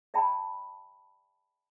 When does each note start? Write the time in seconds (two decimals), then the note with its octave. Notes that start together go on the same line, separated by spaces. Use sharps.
0.14 D5 E5 G5 A5 B5